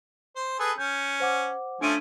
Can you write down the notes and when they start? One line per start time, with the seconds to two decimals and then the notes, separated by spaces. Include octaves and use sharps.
0.36 C5
0.59 G#4 A4 B4
0.78 C#4 G6
1.20 C5 F#5 D6
1.81 F3 A3 C#4 D4 D7 D#7